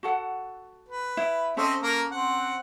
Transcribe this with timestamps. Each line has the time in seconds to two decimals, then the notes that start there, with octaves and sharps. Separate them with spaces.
0.03 F#4 A4 F#5
0.89 B4
1.17 E4
1.57 C4 C#4 A4 D#5 E5
1.83 A#3 A#5
2.11 C4 F#5